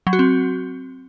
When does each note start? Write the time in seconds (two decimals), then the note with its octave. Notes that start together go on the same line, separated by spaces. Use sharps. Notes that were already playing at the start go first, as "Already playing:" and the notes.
0.07 F#3
0.13 F#4
0.19 C4